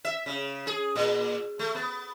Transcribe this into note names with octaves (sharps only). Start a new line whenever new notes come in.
E5
C#3
G#4
A#2
A3
B3